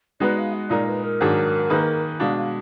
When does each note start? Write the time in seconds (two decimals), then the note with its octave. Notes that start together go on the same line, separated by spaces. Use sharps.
0.20 G#3 B3 D#4 F#4 B4 D5
0.38 F5
0.53 D#5
0.70 A#2 G#3 D#4 A#4 D5
0.86 B4
1.03 A#4
1.21 G#2 D#3 F#3 D4 G#4
1.70 D#3 A#3 D#4 G#4 B4
2.20 B2 G#3 D4 F5
2.36 F5